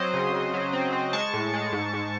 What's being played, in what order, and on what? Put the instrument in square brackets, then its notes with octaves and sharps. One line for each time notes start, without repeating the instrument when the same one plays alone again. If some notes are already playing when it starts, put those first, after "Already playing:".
Already playing: [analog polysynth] F#3 C4 C5 D#5
C#3
C#3
F#3
C4
C4
G#3 A5 C#6
A2
G#3
G#2
G#2